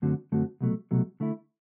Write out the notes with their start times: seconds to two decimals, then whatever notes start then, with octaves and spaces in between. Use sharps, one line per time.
0.02 F#2 D3 A3 C4 F#4
0.32 F#2 D3 A3 C4 F#4
0.61 C2 B2 F#3 A3
0.91 C2 B2 F#3 A3
1.20 D3 A3 E4